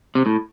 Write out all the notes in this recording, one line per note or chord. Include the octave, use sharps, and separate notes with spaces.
C3
A2